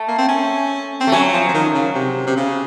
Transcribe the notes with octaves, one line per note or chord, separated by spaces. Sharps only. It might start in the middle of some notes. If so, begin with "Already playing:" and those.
Already playing: A3
A#3
C4
C#4
C4
A3
F#3 C#4
F3
F3
D#3
C#3
C3
C3
C#3